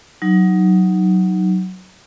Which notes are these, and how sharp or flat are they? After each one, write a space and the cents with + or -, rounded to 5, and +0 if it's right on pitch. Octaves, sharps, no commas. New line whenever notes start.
F#3 +5 D#4 +0